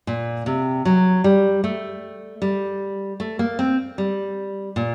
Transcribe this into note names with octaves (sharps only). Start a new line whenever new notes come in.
A#2
C3
F#3
G3
A3
G3
A3
A#3
C4
G3
A#2